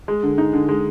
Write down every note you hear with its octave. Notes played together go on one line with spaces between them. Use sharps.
G#3
D3
D#4
D3
G#3